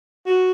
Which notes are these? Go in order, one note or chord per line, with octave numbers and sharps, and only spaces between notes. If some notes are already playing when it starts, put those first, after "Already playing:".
F#4